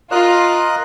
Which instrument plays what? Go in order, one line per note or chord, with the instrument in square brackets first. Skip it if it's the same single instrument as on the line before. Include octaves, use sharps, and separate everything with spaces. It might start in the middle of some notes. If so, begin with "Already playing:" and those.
[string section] F4 [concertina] A#4 D#5 F#6